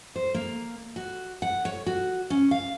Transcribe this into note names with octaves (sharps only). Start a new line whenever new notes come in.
C5
A#3
F#4
F#5
C#5
F#4
C#4
F5